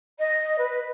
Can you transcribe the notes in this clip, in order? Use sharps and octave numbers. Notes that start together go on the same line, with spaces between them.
D#5
B4